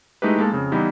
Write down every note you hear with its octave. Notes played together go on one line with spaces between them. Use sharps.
G#3 A3 D#4 E4 G4 B4
G#3 A#3 A4 A5
F2 C#3
E3 G3 B3 D#4 E4